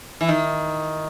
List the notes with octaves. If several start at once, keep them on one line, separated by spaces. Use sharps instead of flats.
E3
D#3